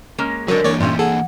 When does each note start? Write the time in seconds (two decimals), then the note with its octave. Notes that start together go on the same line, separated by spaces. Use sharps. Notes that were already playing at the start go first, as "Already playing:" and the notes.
0.18 G#3 A#3 C#4
0.48 D3 F#3 G#3 D4 A#4 B4 C#5
0.64 E3 A#3 C#5 D5
0.80 G2 A#2 G3 A3 C#4 C6
0.99 G#4 A4 F#5